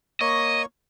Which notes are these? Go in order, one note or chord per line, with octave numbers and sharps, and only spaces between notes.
A#3 C#5 D#5 C#6